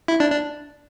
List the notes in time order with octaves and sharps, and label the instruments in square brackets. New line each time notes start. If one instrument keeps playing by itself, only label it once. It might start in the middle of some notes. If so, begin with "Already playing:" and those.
[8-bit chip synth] E4
D4
D4